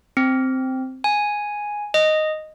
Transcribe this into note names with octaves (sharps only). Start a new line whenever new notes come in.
C4
G#5
D#5